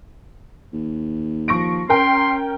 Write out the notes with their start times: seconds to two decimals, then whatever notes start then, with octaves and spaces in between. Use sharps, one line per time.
0.73 D#2
1.48 F3 C#6 A#6 D7
1.89 C#4 A#4 G5 C6